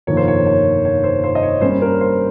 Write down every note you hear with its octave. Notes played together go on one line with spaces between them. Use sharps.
G1 F2 C3 D#3 A#3 C#5
C5
C#5
C#5
C#5
C5
C5
D#5
C#5
G2 G3 A#3 C#4 C5
A#4
C5